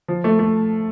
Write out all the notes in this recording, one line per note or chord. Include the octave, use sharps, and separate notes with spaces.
F3
A3
A3